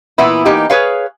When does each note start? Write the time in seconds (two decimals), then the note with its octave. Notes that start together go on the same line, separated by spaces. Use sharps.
0.18 A#2 E3 B3 E4
0.45 E3 A#3 D#4 G4
0.70 G#4 B4 C#5 F5